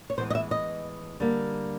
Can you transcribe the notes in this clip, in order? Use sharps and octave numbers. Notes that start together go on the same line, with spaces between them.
C#5
A2 E3 G#3 B3 C5
D#5
E5
D#5
D3 G3 A#3